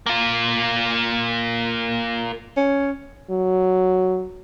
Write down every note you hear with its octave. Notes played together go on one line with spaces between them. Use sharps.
A#3 F4
C#4
F#3